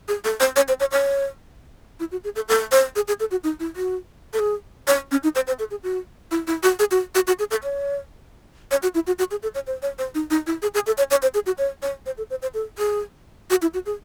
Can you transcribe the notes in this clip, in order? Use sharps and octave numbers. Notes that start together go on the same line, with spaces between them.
G#4
A4
C5
C#5
C5
C#5
C#5
E4
F#4
G#4
A4
A4
C5
G#4
G#4
A4
F#4
D#4
E4
F#4
A4
G#4
C#5
C#4
D#4
C5
C5
A4
G#4
F#4
E4
E4
F#4
G#4
F#4
F#4
F#4
G#4
A4
C#5
C#5
F#4
E4
F#4
F#4
G#4
A4
C#5
C5
C#5
C5
D#4
D#4
E4
G#4
G#4
A4
C#5
C#5
C5
G#4
F#4
C#5
C#5
C5
A4
C5
C5
A4
G#4
F#4
E4
F#4
G#4